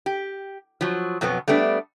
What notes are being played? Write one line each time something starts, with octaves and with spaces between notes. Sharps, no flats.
G4
F3 F#3
F2 B2 F#3 B3
G3 A3 B3 D4